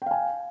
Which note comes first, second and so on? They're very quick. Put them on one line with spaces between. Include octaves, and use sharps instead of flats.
G5 F5 G#5